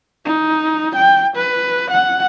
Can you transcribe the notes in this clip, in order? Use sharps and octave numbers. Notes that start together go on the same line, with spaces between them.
D#4
G5
B4
F#5